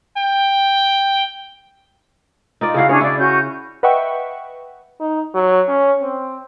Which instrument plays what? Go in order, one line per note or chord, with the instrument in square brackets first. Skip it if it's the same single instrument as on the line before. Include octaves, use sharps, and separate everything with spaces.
[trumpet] G5
[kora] D#4 F4 D5
[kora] C#3 E4 F#4 [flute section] F5
[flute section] C#4 D4 G#4 [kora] C#5
[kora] E4 [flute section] D5
[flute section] C#4 F#4 G6
[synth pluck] B4 D#5 E5 F#5 G5 C#6
[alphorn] D#4
F#3
C#4
C4